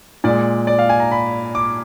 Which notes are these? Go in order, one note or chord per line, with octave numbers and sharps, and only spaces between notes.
A#2 G#3 D5
D5
F5
G#5
A#5
B5
D6